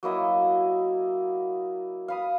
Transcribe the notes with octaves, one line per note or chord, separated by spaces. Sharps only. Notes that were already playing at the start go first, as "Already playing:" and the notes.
F#3 A#3 E4 D#5
F5 B5 D#6